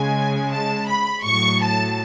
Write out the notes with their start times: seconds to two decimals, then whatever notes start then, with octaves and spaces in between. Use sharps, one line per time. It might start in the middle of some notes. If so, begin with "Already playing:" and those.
Already playing: C#3 G#3 G#5
0.51 A5
0.88 B5
1.24 A2 F#3 C#6
1.62 A5